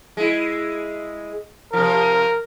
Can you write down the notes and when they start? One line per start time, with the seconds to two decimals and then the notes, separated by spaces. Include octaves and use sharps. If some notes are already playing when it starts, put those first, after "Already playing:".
0.17 G#3 E4
1.73 C3 F3 A#4